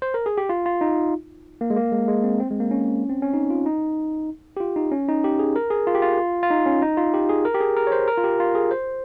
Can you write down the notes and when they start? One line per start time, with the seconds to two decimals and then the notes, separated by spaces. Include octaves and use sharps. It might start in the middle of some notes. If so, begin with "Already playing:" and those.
0.02 C5
0.14 A#4
0.26 G#4
0.38 G4
0.49 F4
0.66 F4
0.81 D#4
1.61 A#3
1.70 G#3
1.76 A#3
1.92 G#3
2.08 G#3
2.24 C4
2.40 C4
2.50 G#3
2.60 A#3
2.71 C#4
3.09 C4
3.22 C#4
3.34 D#4
3.50 F4
3.66 D#4
4.57 G4
4.60 F4
4.76 D#4
4.91 C#4
5.08 D#4
5.24 G4
5.39 G#4
5.56 A#4
5.70 G#4
5.87 F4
5.95 G4
6.02 F4
6.43 F4
6.51 D#4
6.66 C#4
6.82 D#4
6.97 F4
7.14 G4
7.29 G#4
7.45 A#4
7.54 G4
7.61 G#4
7.77 A#4
7.87 C#5
7.92 C5
8.08 A#4
8.18 F4
8.24 G4
8.40 F4
8.55 G#4
8.71 C5